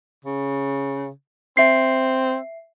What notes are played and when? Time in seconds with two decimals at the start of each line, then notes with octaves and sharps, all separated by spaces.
0.25 C#3
1.57 C4 E5 C7